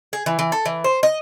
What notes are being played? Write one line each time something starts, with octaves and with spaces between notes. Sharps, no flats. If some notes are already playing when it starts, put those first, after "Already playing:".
G#4
E3
E3
A4
E3
C5
D#5